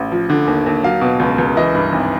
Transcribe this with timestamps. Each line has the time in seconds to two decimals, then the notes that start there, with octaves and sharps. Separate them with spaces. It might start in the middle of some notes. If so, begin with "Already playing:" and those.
Already playing: A1
0.12 F3
0.30 D3
0.47 D#2
0.66 D#2
0.84 F#3 F5
1.01 B2
1.20 C#2
1.38 C#2
1.57 E3 D#5
1.75 G2
1.92 G#1